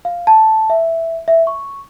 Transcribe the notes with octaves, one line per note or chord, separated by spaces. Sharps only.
F5
A5
E5
E5
C#6